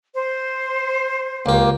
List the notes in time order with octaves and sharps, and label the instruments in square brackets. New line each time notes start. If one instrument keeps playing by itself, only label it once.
[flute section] C5
[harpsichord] C#2 G4 [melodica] A#3